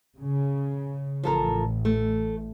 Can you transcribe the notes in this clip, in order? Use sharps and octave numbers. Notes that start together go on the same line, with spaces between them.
C#3
A1 F3 A4 A#4
A3